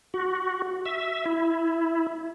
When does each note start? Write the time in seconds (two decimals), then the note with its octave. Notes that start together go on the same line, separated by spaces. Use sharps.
0.14 F#4
0.86 E5
1.25 E4